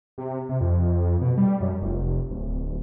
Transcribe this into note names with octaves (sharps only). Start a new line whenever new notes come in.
C3
C3
F2
B2
G3
F#2
F1
D1